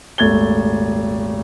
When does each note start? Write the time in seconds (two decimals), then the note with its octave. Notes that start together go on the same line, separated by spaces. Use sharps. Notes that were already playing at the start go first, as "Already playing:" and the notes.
0.18 D#1 G#1 A3 G#6 A6 G7